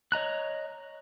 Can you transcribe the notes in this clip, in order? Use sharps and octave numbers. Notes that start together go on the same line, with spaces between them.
C#5 D#5 A#5 F#6